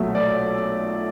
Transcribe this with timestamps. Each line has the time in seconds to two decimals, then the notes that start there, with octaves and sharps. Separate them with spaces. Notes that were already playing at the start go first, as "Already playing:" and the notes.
Already playing: B1 A#2 F#3 A3 E5
0.15 D5